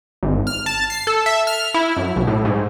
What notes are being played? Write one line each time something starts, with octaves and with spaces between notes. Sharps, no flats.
G#1
F6
A5
C7
A4
E5
F6
E4
F#2
B1
A2
G#2